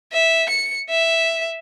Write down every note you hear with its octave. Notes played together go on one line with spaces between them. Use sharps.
E5
C#7
E5